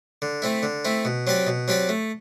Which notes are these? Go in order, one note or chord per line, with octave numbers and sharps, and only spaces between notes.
D3
A3 C4 E4
D3
A3 C4 E4
B2
F#3 C4 G4 D5
B2
F#3 C4 G4 D5
A3